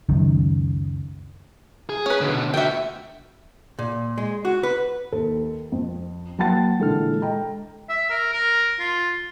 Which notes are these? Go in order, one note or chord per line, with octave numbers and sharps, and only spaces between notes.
C#2 F#2 D#3
G#4
C#4 B4
B2 D3
D3 F#4 E5 G5
A#2
G#3
F#4
B4
D#2 A4
F2
F#3 A#3 F#5 G5 A5 A6
A#2 D3 E3 G#3 A4 F6
D#5 G5 A#5
E5
A#4
A#4
F4